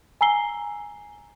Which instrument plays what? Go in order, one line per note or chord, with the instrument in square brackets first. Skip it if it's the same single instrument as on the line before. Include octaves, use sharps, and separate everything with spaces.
[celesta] G#5 A#5 E6 C7 G7